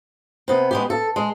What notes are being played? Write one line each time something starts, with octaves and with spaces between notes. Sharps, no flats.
C3 B3
G#3 B3 G4
A4
G#3